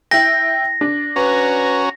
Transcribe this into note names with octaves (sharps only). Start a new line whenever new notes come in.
E4 G5 A#6
D4
C#4 F#4 B4 A#5